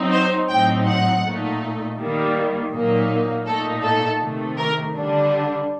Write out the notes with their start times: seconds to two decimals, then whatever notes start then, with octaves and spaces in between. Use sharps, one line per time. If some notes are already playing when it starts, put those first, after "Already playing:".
Already playing: F#3 C4 D#4
0.11 C5
0.49 A2 F#3 C4 D#4 G5
0.86 F#5
1.23 A#2 A3 D#4
1.98 D#3 G3 A#3
2.71 A#2 F#3 A#3 D#4
3.46 A#2 A3 D#4 A4
3.83 A4
4.21 C3 D#3 A3
4.58 A#4
4.95 D3 G3 D4